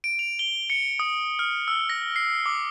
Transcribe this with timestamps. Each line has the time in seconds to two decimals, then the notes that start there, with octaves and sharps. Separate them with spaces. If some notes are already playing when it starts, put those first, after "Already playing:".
0.04 D7
0.19 F7
0.39 G7
0.70 C#7
0.99 D#6
1.39 F6
1.68 E6
1.89 A#6
2.16 C7
2.46 D6